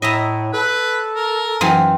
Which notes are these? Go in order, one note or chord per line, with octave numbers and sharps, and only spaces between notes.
A2 D#5 E5 A#5
A4 B4
A#4
F#2 E3 F5 G5 C6